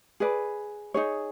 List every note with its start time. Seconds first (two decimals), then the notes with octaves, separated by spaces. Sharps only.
0.20 G#4 B4 D5
0.94 D#4 G#4 C#5